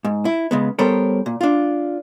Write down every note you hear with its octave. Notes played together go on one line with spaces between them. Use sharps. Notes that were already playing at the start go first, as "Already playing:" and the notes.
G#2
E4
C#3 G#3 B3
G3 B3 A4 A#4 C5 C#5
A#2
D4 F4